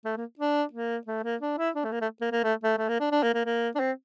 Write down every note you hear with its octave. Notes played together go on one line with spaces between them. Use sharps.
A3
A#3
D4
A#3
A3
A#3
D4
E4
D4
A3
A#3
A3
A#3
A#3
A3
A3
A3
A#3
D4
D4
A#3
A#3
A#3
D4
C4